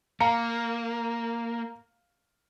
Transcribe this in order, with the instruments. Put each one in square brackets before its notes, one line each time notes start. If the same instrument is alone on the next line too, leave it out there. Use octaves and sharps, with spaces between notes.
[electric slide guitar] A#3 [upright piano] F5 A#5 C#7